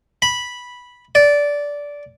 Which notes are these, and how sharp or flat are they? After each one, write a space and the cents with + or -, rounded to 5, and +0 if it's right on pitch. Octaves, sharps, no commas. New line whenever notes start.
B5 -10
D5 -15